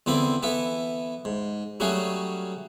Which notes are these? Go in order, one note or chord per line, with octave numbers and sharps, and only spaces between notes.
E2 D3 C4 E4 D5
E3 B3 E4 A4
G#2
F#3 G3 A3 C#4 F#4 G#4